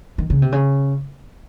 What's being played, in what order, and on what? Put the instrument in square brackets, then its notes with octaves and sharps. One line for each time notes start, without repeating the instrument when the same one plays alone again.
[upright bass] D#3
C#3
C3
C#3